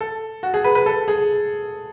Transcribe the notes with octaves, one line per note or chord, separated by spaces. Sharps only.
A4
F#4
G#4
B4
B4
A4
G#4